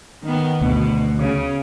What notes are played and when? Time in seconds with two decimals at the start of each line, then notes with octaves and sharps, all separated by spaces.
0.25 D#3 B3
0.61 D2 B2
1.18 C#3